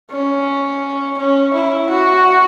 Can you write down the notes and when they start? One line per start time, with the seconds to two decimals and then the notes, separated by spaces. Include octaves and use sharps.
0.11 C#4
1.18 C#4
1.54 E4
1.90 F#4